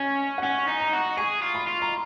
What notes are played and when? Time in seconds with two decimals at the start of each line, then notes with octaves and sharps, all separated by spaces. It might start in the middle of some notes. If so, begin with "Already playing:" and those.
Already playing: C#4 G#5
0.38 F#5
0.43 C#4 G#5
0.68 D#4
0.80 A#5
0.93 F#4
1.17 G#4 C#6
1.42 F4
1.55 B5
1.67 F4
1.82 A#5